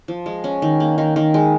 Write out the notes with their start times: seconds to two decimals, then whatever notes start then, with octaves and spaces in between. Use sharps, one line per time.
0.08 F3
0.26 G#3
0.44 C#4
0.62 D#3
0.80 A#3
0.98 D#3
1.16 D#3
1.34 G#3